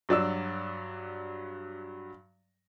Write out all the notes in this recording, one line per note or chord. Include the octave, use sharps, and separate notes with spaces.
G2 F#3 D5 E6